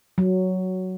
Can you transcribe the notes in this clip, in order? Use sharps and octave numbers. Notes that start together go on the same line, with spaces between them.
F#3